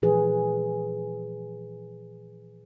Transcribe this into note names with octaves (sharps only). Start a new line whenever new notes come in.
A#2 E3 F3 G#4 B4